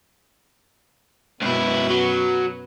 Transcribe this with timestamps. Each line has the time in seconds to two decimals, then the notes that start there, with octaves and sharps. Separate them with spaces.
1.42 C#2 F#2 B2 E4 B4
1.90 F#3